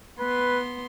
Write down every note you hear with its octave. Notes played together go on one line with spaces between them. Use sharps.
B3 B4 C6